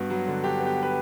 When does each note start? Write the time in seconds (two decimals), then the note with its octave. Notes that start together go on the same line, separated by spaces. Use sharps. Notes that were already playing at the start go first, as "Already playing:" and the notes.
Already playing: G2 B3 F#4
0.10 F#3
0.27 D3
0.44 D3 G4
0.60 B3
0.66 G4
0.82 B4